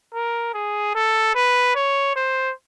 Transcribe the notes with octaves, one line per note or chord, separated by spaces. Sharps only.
A#4
G#4
A4
B4
C#5
C5